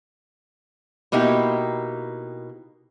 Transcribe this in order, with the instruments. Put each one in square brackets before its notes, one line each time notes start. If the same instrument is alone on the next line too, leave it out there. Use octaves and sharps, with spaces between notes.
[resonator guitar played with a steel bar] B2 A#3 D#4 E4 G4